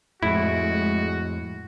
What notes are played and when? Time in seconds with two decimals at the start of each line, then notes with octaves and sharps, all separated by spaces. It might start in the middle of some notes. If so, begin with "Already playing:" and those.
0.23 F2 A2 G#3 E4 F#4